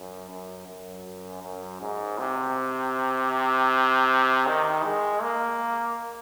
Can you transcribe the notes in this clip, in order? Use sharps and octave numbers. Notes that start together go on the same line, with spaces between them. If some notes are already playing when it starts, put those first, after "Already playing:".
Already playing: F#2
F#2
F#2
F#2
G#2
C3
D#3
G#3
A#3